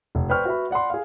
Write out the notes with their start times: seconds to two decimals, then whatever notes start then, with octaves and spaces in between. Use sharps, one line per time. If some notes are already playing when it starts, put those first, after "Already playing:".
0.15 F1
0.30 B4 C5 D5 G5 C#6 F6
0.45 F#4 B4 E5 B5
0.71 D5 F#5 B5 C6
0.90 G#4 F5